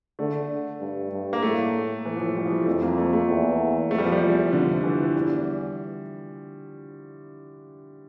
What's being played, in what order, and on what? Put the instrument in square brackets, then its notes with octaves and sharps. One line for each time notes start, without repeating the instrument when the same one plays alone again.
[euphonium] D3 [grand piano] A3
[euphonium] G2
G2
[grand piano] A#3
[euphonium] A2 [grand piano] A3
[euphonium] A2 [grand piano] E3
[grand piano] F3
E3
G3
F3
G3
[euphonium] F2 [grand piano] A3
[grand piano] A#3
A3
A3
[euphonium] E2
[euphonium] F2 [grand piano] A3
[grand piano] G3
F3
G3
[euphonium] E2
[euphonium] F2 [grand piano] D3
[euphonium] G2 [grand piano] E3
[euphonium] E2 [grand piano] G3